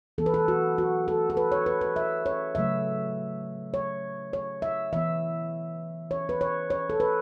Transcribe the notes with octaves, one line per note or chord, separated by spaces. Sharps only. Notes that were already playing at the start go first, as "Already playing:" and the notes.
E3 B3 A4
B4
A4
F#4
F#4
A4
A4
B4
C#5
B4
B4
E5
C#5
C#3 F#3 A3 E5
C#5
C#5
E5
E3 B3 E5
C#5
B4
C#5
C#5
A4
B4